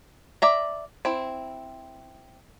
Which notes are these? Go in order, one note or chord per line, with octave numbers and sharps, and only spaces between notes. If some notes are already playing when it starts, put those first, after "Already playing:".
D5 E5 A#5
C4 E4